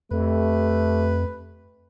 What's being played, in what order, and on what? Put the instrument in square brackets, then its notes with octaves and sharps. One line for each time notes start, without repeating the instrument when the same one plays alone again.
[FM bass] F2 [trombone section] A3 G4 [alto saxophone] B4